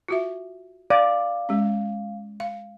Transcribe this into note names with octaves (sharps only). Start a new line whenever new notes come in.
F4 F#4 E5
D5 F5
G#3 C#4
F5